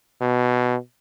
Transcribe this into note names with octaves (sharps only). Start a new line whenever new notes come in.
B2